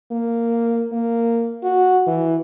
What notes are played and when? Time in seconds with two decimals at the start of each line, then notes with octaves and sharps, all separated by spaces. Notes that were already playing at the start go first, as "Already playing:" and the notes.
0.11 A#3
0.93 A#3
1.64 F#4
2.07 E3